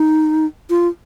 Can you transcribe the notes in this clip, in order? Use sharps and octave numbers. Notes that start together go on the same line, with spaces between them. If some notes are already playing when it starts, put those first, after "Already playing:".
Already playing: D#4
F4